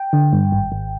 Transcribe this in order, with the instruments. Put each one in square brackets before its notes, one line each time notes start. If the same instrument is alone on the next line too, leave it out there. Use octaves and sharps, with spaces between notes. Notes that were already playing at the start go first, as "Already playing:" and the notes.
Already playing: [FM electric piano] G5
D3
G2
G#1
G#1